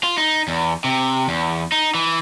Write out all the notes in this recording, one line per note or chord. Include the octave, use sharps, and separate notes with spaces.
F4
D#4
E2
C3
E2
D#4
E3